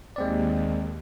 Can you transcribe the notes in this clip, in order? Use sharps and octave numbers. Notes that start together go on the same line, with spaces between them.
D#2 G#3 C4 D5